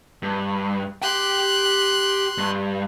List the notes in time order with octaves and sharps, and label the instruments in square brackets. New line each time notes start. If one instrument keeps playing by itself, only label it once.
[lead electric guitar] G2
[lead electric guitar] G4 G5 [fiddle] C6 F#6
[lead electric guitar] G2